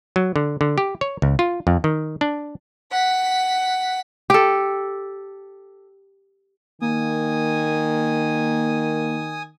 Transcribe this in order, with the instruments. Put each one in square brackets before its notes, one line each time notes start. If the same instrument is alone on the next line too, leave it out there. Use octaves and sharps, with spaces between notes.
[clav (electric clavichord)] F#3
D3
D3
G4
C#5
C#2
F4
F2
D#3
D4
[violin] F#5 B6
[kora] G4 A4
[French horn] D#3 [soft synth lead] A#3 [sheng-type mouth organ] G#5 D#6